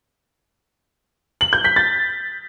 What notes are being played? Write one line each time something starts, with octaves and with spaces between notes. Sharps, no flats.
F#7
G6
B6
A6